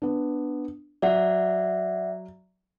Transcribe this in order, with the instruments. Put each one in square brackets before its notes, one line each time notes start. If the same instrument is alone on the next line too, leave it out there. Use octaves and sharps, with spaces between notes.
[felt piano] B3 D4
[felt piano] F#3 [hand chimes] D5 E5 F#5